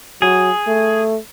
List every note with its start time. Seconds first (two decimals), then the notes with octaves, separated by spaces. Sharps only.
0.22 F#3 G#4
0.67 A3